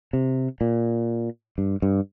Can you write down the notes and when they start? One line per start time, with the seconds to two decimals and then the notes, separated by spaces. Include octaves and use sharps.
0.13 C3
0.61 A#2
1.58 G2
1.82 G2